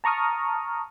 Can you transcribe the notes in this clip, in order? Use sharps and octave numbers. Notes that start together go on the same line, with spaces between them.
A5 A#5 C#6 D#6 F6